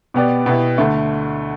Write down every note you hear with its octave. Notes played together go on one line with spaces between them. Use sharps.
B2 B3 G4 D5
B2 B3 E4 G4
D2 D3 A3